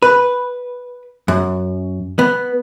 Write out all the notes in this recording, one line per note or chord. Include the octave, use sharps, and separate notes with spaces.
B4
F#2
B3